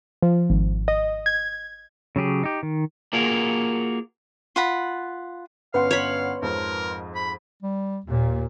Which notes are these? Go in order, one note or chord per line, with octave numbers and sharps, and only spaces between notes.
F3
G#1
D#5
G#6
C#3 F#3 G4 G#4
D#4 G4
D#3
A#3 F4 F#4 G#4 A#4
F4 F#5 B5
G1 C#4 B4 F5 F#5 C6
C#5 B5
F2 G#2 F3 A#4
B5
G3
D#2 A#2